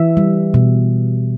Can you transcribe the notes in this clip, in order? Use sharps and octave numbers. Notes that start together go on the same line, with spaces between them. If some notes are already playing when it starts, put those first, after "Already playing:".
Already playing: E3 E5
G3
B2